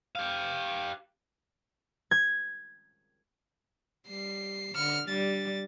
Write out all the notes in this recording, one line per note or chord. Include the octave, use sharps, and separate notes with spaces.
G4 F5
G#6
G3 C7
D3 F6 C#7
G3 D4 A6